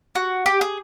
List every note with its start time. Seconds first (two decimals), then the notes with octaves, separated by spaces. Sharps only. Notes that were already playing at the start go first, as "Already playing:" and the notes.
0.15 F#4
0.46 G4
0.61 G#4